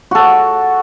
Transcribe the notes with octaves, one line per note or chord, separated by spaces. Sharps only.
F#4 A4